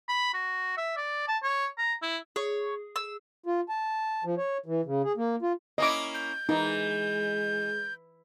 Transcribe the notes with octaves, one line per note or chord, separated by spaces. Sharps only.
B5
F#4
E5
D5
A5
C#5
A#5
E4
G#4 C#5
E6
F4
A5
F3
C#5
E3
C#3
G#4
A#3
F4
A#3 C#4 E4 D#5 D6
G6
E3 G#3 D#4